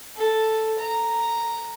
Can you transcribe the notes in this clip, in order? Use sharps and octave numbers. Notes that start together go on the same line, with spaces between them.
A4
A#5